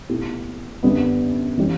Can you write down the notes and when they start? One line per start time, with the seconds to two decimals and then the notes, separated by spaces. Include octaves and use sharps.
0.09 B2 A3 E4 G4
0.83 F#2 D3 G3 B3
1.57 E3 G3 C#4 G4